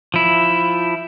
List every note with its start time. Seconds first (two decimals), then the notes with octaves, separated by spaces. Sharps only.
0.14 F3 E4